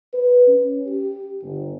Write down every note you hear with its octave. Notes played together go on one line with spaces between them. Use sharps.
B4
C#4
G4
G1